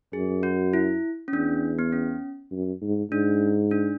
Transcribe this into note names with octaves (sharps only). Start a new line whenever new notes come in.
F#2 G#4
F#4
E4
C#4
E2 D4
B3
C#4
F#2
G#2
G#2 D4
D4